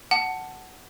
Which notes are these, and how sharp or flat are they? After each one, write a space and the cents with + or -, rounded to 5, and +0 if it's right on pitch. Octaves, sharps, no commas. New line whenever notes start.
F#5 +10 A5 +0